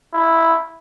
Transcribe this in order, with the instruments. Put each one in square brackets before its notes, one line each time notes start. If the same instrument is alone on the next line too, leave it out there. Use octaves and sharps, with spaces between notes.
[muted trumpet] E4